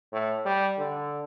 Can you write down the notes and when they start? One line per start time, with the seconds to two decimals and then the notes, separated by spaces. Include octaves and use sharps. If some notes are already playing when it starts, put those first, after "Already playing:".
0.12 A2
0.45 G3
0.78 D3